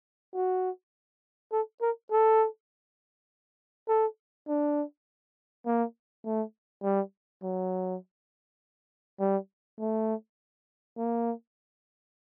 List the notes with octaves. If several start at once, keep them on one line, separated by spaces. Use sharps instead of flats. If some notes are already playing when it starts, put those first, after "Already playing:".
F#4
A4
A#4
A4
A4
D4
A#3
A3
G3
F#3
G3
A3
A#3